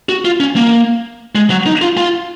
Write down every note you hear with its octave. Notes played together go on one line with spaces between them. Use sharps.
F#4
F4
C#4
A#3
G#3
F#3
D#4
F4
F4